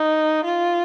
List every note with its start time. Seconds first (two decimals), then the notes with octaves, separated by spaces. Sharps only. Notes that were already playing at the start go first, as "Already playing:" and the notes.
Already playing: D#4
0.45 F4